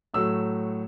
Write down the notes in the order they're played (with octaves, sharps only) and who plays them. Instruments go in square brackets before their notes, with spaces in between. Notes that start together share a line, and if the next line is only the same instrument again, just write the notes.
[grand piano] A2 F#3 A3 E6